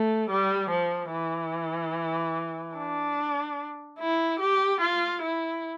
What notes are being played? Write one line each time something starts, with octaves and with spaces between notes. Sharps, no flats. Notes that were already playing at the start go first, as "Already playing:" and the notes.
Already playing: A3
G3
F3
E3
D4
E4
G4
F4
E4